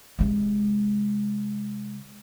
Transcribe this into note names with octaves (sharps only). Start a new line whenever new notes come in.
C3 G#3